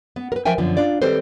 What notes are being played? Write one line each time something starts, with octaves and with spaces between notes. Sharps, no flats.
B3
A#4 B4
F3 A#4 E5 G5 G#5
F#2 D3 F3 B3
D4 F4 D5
D#3 G3 C4 A4 B4 C5